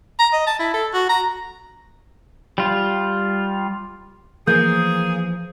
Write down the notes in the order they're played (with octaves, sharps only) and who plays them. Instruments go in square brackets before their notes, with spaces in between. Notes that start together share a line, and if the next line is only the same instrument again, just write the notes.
[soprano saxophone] A#5
D#5
A5
E4
A4
F#4
A#5
[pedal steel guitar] G3 F4
[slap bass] E3 F3 [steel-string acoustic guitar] A#3 [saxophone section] G#4 [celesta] G6